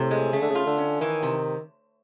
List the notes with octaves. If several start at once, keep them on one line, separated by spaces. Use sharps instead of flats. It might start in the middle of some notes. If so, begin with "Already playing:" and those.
Already playing: A2 C3
G#3
C#3 A3
D3
C#3
F4
D3
C#4
D#3 E3
C3